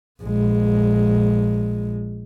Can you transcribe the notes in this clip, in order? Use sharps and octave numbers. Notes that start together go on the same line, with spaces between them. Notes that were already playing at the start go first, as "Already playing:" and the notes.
A#1 G#3